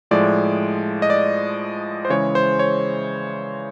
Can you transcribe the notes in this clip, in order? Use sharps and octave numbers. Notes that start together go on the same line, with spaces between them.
A2 F3 G#3 D5
D#5
D5
C5
C#3 E3 G#3 C#5
C5
C#5